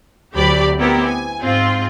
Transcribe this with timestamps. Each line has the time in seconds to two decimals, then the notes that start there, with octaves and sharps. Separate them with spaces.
0.36 D2 F#3 G4 D5 B5
0.79 B3 C4 E4 G4 A#4
1.07 G#5
1.42 G#2 C4 F4